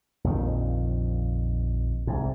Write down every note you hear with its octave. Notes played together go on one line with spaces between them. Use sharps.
A#1 F2 D#3
C2 G#2